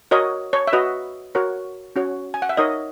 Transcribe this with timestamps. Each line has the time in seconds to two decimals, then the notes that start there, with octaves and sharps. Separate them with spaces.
0.11 F#4 A#4 C#5 D#5
0.53 C#5
0.67 E5
0.73 F#4 B4 D#5
1.35 F#4 A#4 C#5
1.96 C#4 F#4 C#5
2.34 G#5
2.42 F#5
2.49 E5
2.57 D#4 A#4 C#5 D#5